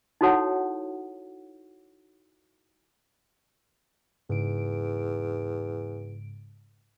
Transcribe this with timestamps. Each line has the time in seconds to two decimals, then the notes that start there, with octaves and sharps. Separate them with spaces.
0.21 D#4 E4 F#4 A4 C#5 F#5
4.29 E2 G#2 C#3 D7